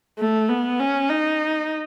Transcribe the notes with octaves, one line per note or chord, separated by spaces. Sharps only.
A3
B3
C#4
D#4